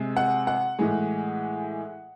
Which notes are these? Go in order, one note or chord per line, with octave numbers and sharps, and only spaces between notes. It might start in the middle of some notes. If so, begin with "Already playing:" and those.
Already playing: C3 G#3
F#5
F#5
A2 E3 G#3